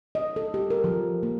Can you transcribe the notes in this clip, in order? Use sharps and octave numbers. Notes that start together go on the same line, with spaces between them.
D#5
A4
G4
A#4
F3
A#3